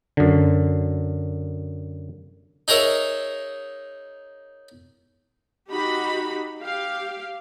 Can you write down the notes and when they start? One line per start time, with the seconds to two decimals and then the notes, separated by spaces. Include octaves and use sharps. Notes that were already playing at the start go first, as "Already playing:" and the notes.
0.17 F#2 D3
2.68 D#4 G#4 A#4 C#5 E5
5.69 D#4 F#4 G4 B5
6.60 G4 F5